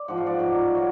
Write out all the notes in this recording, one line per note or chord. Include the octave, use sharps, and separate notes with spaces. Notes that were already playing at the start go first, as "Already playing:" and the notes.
Already playing: D5
G#2 F3 F#5
F5
D5 F#5
G#2 F#3
F#3